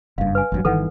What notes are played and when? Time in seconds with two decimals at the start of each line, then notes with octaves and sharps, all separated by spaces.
0.18 F#1 G2 F5
0.35 B4 G#5
0.52 G#1 G2 F#3
0.65 G1 D#3 E3 A4 B4 F#5